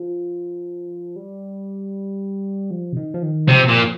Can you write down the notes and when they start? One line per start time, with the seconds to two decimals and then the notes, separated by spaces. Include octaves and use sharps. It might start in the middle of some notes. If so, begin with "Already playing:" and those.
Already playing: F3
1.16 G3
2.71 F3
2.93 C3
2.96 D#3
3.14 F3
3.23 D#3
3.48 C3 F3
3.68 A#2